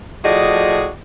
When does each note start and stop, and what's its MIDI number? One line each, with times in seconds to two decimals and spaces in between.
0.24 0.90 45
0.24 0.90 53
0.24 0.90 66
0.24 0.90 68
0.24 0.90 74
0.24 0.90 75